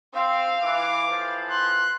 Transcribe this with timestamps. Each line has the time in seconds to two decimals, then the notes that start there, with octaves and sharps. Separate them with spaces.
0.14 C4 F5
0.63 E3 D6
1.08 A2 E3 F3
1.50 C6 F#6